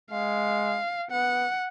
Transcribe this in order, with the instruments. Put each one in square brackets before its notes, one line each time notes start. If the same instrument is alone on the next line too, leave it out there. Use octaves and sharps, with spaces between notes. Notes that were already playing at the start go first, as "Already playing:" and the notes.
[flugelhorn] G#3 [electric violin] F5
[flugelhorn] B3 [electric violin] F#5